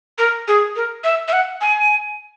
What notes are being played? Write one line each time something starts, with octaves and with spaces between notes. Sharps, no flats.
A#4
G#4
A#4
E5
E5
F#5
G#5